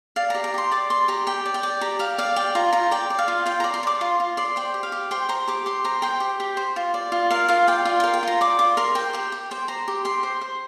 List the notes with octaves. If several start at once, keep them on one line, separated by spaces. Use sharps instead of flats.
D5 F5
G4 A#5
A#5
G4 C6
D5 D6
D5 C6
G4 A#5
G4 G5
D5
G5
D5
G4 A#5
G4 F5
D5 F5
D5 G5
F4 A#5
F4 A#5
D5 G5
D5
F5
F4
F4 G5
D5 A#5
C6
D5
D6
F4 C6
F4
D5 C6
C5 G5
G4
F5
G4
C5 G5
C5 A#5
G4 D6
G4 C6
C5 A#5
C5 G5
G4
G4
C5
F4
D5
F4
A#4 F5
F4 F5
D5 G5
F4 F5
A#4 G5
G5
F4 A#5
D5 D6
F4 D6
A#4 C6
C5 G5
G4 G5
G4
C5 G5
C5 A#5
G4
G4 C6
C5
C5